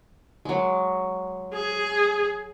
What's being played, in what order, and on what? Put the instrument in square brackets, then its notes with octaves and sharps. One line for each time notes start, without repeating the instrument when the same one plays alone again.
[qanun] F#3 G#3
[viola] G#4